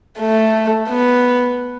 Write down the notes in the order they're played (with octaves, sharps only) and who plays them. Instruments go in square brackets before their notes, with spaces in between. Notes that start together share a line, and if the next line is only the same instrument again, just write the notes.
[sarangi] A3
B3